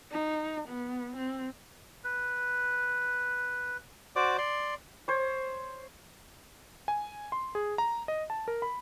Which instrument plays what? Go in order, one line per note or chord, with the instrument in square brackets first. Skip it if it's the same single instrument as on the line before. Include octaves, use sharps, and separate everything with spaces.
[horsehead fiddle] D#4
B3
C4
[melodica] B4
F#4 C5 D5 D6
D5 C6
[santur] C5 C#5
[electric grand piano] G#5
C6
G#4
A#5
D#5
A5
A#4
B5